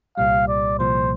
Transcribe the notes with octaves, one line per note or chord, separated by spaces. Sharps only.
C2 A#2 G3 F5
D5
C2 A#2 F3 C5